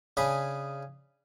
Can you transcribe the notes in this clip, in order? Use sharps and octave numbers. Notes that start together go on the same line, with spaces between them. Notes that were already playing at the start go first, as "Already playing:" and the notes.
C#3 D4 G#4 G#5 B5